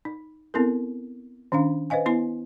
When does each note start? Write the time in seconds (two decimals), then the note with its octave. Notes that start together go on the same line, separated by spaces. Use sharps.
0.05 D#4
0.54 B3 C4 E4 A4 A#4
1.52 D#3 C#4 D4 F5
1.90 B4 C5 D#5 F5 G#5
2.06 B3 E4 C6